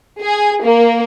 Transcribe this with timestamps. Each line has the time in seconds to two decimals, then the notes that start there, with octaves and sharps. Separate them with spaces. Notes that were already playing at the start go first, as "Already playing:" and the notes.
0.23 G#4
0.64 A#3